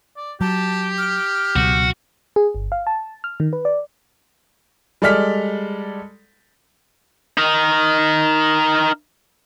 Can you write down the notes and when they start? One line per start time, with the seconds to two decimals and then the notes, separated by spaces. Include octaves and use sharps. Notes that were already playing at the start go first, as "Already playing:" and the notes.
0.17 D5
0.41 F#3 G4 A5
0.98 F6
1.56 C#2 B2 F#3 F#4
2.36 G#4
2.55 G1
2.72 F5
2.87 A5
3.24 F6
3.40 D#3
3.53 B4
3.65 D5
5.02 G3 G#3 A4 D5 F6 B6
7.38 D#4 A#4